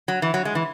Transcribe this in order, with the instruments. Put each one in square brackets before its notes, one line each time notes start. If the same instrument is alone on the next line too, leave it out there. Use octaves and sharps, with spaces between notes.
[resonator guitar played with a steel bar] F#3
E3
F#3
G#3
E3